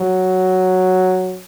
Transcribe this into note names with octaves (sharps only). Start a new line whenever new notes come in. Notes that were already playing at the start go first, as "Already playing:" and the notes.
Already playing: F#3